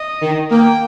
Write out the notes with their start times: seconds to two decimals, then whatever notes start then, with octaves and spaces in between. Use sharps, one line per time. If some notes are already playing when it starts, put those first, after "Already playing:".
Already playing: D#5
0.21 D#3
0.51 A#3 G5